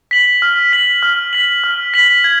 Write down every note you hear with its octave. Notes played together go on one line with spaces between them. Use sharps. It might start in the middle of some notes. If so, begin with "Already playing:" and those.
B6 F#7
F6
B6 F#7
F6
B6 F#7
F6
B6 F#7
G#6